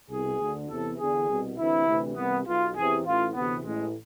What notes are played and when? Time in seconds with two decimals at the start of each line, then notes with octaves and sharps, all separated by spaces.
0.10 C2 B2 G#4
0.40 D2 D3
0.69 E2 C3 E3 A4
0.99 E2 D3 G#4
1.29 C2 B2
1.58 D2 C3 E3 E4
1.87 D2 C3 E3
2.16 C2 C3 E3 B3
2.46 B1 B2 F4
2.75 E2 C3 E3 G#4
3.05 A1 A2 E3 F4
3.34 D2 C3 E3 B3
3.63 A1 A2 E3 G#3